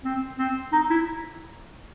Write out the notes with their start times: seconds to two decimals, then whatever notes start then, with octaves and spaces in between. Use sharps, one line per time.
0.04 C4
0.38 C4
0.72 D#4
0.90 E4